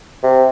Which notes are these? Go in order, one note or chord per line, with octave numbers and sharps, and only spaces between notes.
C3